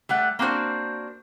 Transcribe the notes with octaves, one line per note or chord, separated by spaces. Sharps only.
G3 A3 F#5
A#3 C4 D4 F#4 C5